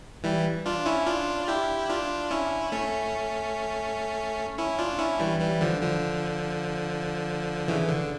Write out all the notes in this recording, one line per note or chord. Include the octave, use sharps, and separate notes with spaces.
E3 G3
D4 F4
C#4 E4
D4 F4
E4 G4
D4 F4
C#4 E4
A3 C#4
C#4 E4
D4 F4
C#4 E4
E3 G3
E3 G3
D3 F3
D3 F3
C#3 E3
D3